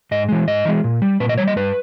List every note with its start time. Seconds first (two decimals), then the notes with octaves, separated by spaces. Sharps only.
0.11 G#2 D#5
0.29 E3 G#3
0.47 G#2 D#5
0.65 E3 G#3
0.84 A#2
1.02 G3
1.20 A#2 B4
1.29 D#5
1.38 G3 C#5
1.47 D#5
1.56 G2 B4